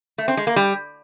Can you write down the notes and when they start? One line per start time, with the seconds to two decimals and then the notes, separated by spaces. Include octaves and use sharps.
0.18 A3
0.28 C4
0.37 G#3
0.47 A#3
0.56 G3